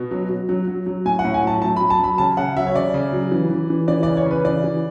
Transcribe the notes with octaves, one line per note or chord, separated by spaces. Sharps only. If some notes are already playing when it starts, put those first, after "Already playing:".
Already playing: B2
F#3
F#3
F#3
F#3
F#3
A2 G#5
F#5
A2
G#5
F#3 A5
F#3 A5
F#3 B5
A5
F#3 B5
C#3 A5
C#3 F#5
F#3 E5
C#5
C#3 D5
C#3
F#3
E3
E3
E3
E3 D5
C#3 D5
C#5
C#3 B4
E3 D5
E3